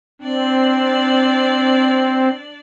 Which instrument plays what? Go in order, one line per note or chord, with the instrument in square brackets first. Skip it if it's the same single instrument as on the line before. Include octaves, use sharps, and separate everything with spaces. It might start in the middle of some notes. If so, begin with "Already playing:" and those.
[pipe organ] C4 [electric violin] D4 D5